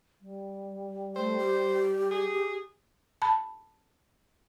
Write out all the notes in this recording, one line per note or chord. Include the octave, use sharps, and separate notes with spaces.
G3
A3 C5
G4
G#4
A5 B5